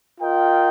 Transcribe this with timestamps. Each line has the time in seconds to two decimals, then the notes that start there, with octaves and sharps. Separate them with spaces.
0.21 F4 A#4 D#5 G5